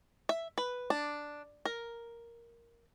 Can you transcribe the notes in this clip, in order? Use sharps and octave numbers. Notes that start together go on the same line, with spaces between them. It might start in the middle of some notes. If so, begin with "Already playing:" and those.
E5
B4
D4
A#4